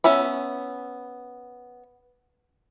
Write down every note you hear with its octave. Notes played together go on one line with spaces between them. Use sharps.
B3 C#4 E5 B5